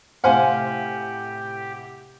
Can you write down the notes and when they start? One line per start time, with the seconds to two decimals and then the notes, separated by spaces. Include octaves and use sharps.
0.24 A2 C3 G4 C5 F5 F#5 G#5